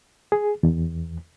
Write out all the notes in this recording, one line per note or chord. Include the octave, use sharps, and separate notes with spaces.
G#4
E2